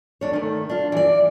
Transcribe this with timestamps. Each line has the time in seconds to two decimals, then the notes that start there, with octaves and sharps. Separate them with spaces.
0.21 D#2 D4 C#5
0.33 D#3 A3
0.70 D4 F4
0.92 E3 D5